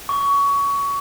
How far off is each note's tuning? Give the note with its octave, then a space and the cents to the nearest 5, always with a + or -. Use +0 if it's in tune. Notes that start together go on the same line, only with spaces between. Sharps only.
C#6 +20